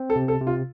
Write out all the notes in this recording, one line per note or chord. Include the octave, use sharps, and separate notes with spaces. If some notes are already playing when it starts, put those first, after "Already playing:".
Already playing: C4
A4
C3
A4
C3
F4